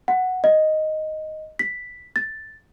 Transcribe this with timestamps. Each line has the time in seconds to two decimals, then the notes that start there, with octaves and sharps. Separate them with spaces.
0.08 F#5
0.44 D#5
1.59 B6
2.16 A6